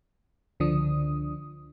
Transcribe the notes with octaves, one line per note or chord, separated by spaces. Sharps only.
C#2 D3 F3 D4 D#6